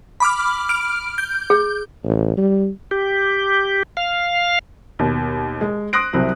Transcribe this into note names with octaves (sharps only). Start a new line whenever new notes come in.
B5 D6 F6
F6 D7
G6
G#4
A1
G3
G4
F5
D#2 B2
G#3
C6 D#6 F#6 A#6 D7
C2 C3 F#3 C4